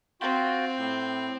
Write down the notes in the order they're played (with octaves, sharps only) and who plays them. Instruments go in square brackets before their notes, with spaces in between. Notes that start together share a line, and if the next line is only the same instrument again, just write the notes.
[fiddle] C4 [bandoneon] F4 F#4 G5
[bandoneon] A2 G6